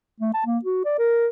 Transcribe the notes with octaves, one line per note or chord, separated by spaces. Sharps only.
A3
A5
A#3
F#4
D5
A#4